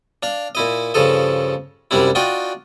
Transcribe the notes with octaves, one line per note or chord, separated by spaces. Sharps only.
D4 F5
A#2 E4 D#5
G2 C#3 F3 A4 D#5
F#2 C3 G3 D4 E4
D4 F4 F#4 D#5 G5